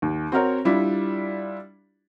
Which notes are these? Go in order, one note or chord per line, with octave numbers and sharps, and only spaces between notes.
D#2
C4 F#4 A#4 C#5
G3 D4 E4 F4